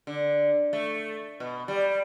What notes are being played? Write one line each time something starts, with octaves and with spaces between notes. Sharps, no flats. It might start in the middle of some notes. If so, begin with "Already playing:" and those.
D3
A3
B2
G3